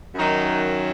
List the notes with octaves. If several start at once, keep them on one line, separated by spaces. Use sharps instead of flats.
F#2 D#3 F#3 D#4